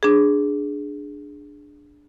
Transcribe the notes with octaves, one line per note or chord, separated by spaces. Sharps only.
D4 G#4